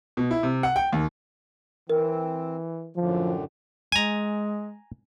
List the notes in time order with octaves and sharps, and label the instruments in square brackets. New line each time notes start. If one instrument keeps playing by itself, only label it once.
[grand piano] B2
E4
C3
F#5
G5
D#2
[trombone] E3 [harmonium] C4 [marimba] A#4
[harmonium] F#2 A2 D3 [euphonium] F3
[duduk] G#3 [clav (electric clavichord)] G#5 A#5